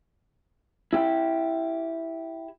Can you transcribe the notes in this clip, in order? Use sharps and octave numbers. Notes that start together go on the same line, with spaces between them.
E4 G4